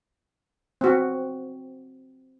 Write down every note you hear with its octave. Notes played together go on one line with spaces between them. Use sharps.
C4 F#4